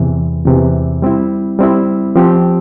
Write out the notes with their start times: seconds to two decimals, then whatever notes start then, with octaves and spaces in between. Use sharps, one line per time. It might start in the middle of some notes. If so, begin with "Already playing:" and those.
Already playing: E2 C3 E3
0.45 E2 C3 E3
1.02 G3 C4 E4
1.59 G3 C4 E4
2.16 F3 C4 G4